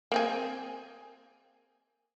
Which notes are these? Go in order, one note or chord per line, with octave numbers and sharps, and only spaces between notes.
A#3 C4 G#4